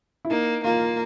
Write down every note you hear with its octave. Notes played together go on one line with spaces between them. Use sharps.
E4
A#3 D#4
A#3 F4